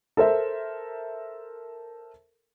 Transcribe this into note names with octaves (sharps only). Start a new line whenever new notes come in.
A4 A#4 C5 E5